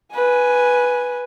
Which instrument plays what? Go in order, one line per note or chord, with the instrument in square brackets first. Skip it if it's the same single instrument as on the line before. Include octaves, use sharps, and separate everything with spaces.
[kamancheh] B4 G#5